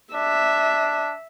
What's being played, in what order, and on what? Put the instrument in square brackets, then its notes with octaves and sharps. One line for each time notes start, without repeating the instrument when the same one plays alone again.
[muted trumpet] D4 [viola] E5